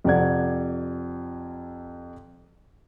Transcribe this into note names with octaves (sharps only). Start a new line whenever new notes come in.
F2 C3 G4 D5 F#5 G#6